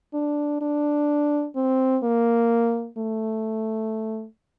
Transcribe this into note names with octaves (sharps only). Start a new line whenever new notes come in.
D4
D4
C4
A#3
A3